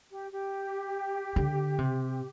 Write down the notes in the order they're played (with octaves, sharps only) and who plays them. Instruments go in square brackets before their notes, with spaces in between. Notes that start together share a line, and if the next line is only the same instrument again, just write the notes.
[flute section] G4
G4
[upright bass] D3
C3